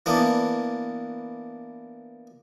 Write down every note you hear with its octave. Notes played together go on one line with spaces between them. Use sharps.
E3 A#3 B3 D4